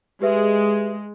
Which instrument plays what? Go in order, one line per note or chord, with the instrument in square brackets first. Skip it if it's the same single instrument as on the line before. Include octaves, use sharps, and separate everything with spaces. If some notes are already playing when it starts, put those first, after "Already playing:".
[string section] G#3 [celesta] G4 B4 E5